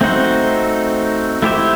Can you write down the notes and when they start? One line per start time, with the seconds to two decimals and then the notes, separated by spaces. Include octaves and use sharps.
0.01 A3 C4 D#4 F#4 C5
1.42 A3 E4 G4 C5 E5